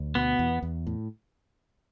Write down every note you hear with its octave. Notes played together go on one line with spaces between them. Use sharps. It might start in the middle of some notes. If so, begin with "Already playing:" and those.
Already playing: D2
B2 B3
E2
E2
A2